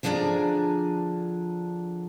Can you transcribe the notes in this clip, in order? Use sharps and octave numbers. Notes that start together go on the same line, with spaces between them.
D3 F3 D4 G#4 D5 A#5